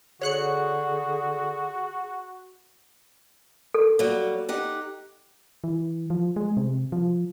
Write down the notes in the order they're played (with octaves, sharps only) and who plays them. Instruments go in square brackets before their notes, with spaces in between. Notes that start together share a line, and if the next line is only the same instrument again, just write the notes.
[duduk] D3 [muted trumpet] F#4 [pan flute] G#4 [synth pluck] C#5 F#6 C#7
[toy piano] A4
[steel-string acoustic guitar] F#3 G3 A#3
D#4 G4 F#5
[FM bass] E3
F3
G#3
C3
F3